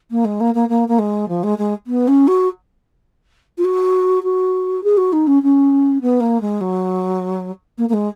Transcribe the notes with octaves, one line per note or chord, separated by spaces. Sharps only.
A#3
G#3
A#3
A#3
A#3
A#3
G#3
F3
G#3
G#3
B3
C#4
F#4
F4
F#4
F#4
G#4
F#4
D#4
C#4
C#4
B3
A#3
G#3
F#3
A#3
A#3
G#3